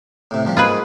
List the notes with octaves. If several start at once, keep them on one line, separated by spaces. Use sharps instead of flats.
A2 C3
C2 F3 G3
G#2 A#3 F4 G#4 B4